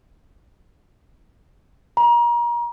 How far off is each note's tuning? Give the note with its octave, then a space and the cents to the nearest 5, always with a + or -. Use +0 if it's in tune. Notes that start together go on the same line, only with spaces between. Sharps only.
A#5 +35